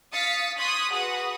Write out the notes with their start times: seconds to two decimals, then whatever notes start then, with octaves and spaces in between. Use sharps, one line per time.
0.13 F5 D#6 A6 B6 C#7
0.58 C6 C#6 D#6 F#6 G#6 B6
0.92 F#4 G#4 B4 F#5 D#6